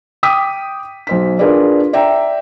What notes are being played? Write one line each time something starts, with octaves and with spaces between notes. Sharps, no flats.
G5 D6 D#6 B6 D#7
B1 C5 B6
D4 F4 G#4 A#4 B4 D5
D5 E5 G5 A#5